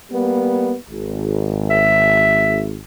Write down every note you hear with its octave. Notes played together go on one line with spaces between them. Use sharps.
G3 A#3 B3
G#1
E5